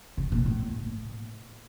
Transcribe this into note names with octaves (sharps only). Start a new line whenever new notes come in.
C#3
A#2
A2